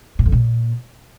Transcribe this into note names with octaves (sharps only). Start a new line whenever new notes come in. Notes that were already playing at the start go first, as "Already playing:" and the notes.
A2
F2
A#2